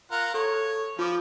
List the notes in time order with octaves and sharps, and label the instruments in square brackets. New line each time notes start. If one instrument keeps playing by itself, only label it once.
[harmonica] F4 A#4 F#5
[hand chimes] A4 [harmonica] C#5
[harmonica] F3 [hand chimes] F4 D6